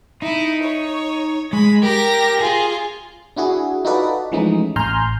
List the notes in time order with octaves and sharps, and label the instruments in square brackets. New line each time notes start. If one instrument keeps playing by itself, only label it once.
[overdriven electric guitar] D#4 [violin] E4
[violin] C#5
[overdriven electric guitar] G#3 [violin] B5
[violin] G4 A#6 [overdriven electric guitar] A#4
[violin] F4 [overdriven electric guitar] G#4
[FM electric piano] D4 E4 F#4 G#4
D#4 F4 F#4 A4 B4 D5
E3 F3 G#3 A3 C#4 D#4
A1 G#5 A#5 C6 F6 G6